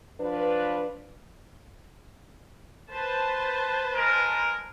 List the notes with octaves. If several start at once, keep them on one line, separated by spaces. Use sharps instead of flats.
F3 D4 F4 B4
B4 C5 A5
G#3 A#4